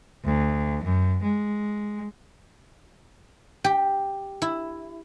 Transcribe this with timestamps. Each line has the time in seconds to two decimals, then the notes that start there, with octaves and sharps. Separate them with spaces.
0.24 D2
0.84 F#2
1.23 G#3
3.64 G4
4.42 E4